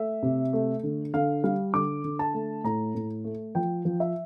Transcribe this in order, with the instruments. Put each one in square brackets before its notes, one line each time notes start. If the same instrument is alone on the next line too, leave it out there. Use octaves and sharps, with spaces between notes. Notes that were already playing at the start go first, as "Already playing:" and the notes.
Already playing: [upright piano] A3 E5
C3
A3
D3
D3 F5
G3 F5
D3 D6
D3
A5
A3
A2 A#5
A2
A3
F3 G5
F3
E5